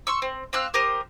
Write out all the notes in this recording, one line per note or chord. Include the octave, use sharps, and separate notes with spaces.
C6 C#6 E6
C4
C4 F5 E6 F#6
G4 A#4 C5 D#6